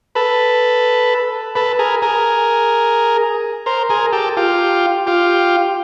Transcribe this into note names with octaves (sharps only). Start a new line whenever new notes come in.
A4 B4
A4 B4
G#4 A#4
G#4 A#4
A#4 C5
G#4 A#4
G4 A4
F4 G4
F4 G4